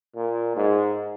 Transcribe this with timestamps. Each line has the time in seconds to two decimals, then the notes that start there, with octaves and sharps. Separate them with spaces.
0.15 A#2
0.56 G#2